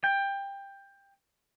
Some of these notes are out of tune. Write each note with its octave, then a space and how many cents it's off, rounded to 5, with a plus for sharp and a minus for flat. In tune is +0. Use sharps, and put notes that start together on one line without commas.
G5 +15